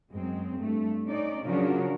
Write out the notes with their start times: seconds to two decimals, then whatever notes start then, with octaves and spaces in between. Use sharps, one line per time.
0.12 F#2 G#3 C4
0.58 G2 A3
1.05 C#4 D#4 D5
1.43 C#3 F3 F#3 D4 F#4 A#4